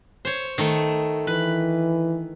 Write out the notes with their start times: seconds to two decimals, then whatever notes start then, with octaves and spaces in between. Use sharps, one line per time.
0.25 C5 C#5
0.58 D#3 A3
1.27 E3 B4